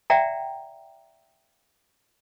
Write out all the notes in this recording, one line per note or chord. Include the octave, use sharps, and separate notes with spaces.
D5 E5 F#5 G5 A#5